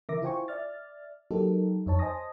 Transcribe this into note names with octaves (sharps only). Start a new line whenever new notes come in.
C#3 E3 A#4 E5 D6 A#6
E4 F4 C5 G5 G#5 C#6
D5 E5 F6 A6
F#3 A#3 D#4 G4 A4 A#4
F2 D#4 C#5 A5
C5 D#5 G#5 A5 D#6 A#6